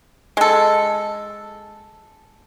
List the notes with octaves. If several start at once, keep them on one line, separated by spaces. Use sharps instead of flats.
G#3 A4